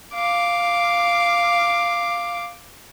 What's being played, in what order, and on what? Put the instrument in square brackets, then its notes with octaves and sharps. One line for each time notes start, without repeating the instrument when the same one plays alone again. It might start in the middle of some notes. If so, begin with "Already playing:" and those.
[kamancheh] F5 D6